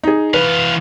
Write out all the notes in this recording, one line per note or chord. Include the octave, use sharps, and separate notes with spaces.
D#4 G#4
E3 B4 F5